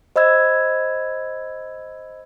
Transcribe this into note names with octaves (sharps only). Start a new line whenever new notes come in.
C5 D#5 B5 E6 G#6